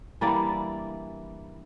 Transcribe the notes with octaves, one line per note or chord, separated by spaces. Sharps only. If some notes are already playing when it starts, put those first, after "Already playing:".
E3 G3 A#3 D4 D5